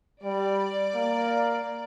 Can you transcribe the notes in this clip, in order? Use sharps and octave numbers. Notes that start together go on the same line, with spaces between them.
G3 D5
A#3